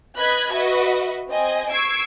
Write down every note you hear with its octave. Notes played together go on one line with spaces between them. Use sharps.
B4 D#5 B5 F#6 G#6
F#4 B4 D#5 E5
C4 D#5 G#5
C#6 E6 G#6 C7 D7